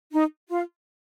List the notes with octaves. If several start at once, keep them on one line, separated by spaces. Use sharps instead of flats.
D#4
F4